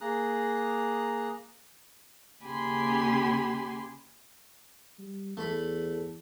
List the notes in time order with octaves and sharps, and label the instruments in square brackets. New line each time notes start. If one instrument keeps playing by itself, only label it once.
[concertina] A#3 G#4 A#5 D#6 F#6
[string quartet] D#2 C#3 G4 G#5 B5 C6
[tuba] G3
[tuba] E2 [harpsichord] A3 B5